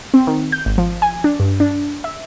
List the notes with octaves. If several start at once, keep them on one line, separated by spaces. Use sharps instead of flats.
C4
D#3
G6
G#1
F3
G#5
D4
G2
D4
E5